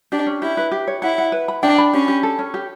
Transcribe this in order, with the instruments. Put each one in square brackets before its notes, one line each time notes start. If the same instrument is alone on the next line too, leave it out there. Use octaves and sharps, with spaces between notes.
[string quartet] D4 [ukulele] G4
[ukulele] C#4
[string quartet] E4 [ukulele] G4
[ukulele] B4
G4
C#5
[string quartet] E4 [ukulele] F#5
[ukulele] F#5
B4
B5
[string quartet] D4 [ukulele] G5
[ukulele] B5
[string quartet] C#4 [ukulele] G4
[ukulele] G4
A4
C#4
G4